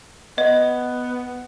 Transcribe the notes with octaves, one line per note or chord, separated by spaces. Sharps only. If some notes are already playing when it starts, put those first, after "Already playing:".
B3 D#5